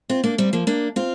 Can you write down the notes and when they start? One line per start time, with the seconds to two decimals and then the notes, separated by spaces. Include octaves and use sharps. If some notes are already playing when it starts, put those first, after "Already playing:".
0.09 C4 F4
0.24 A#3 D4
0.38 G3 C4
0.53 F3 A#3
0.67 A#3 D4
0.96 C4 F4